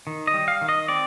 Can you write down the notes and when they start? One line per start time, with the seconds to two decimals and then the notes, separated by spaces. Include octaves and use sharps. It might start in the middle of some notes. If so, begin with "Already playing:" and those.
0.07 D#3
0.27 D#5
0.34 G3
0.48 F5
0.61 D#3
0.69 D#5
0.88 C4 D5